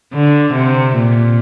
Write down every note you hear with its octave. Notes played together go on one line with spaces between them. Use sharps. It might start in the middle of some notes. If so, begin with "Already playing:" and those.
D3
C3
A#2